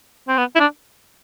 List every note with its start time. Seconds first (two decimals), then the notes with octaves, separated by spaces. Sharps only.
0.28 C4
0.38 B3
0.55 E4
0.60 D4